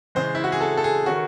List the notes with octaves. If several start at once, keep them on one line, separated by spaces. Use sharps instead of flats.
C#3 E3 G#3 C5
E4
F#4
G#4
A4
A4
G#4
D#3 A3 C#4 F#4